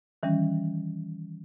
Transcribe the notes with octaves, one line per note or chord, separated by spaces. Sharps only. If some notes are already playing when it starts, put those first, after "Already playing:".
D#3 E3 G3 C#4